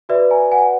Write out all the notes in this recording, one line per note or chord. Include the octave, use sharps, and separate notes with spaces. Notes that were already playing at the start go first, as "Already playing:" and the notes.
F#4 B4 D5 E5
G#5 A#5
F#5 G#5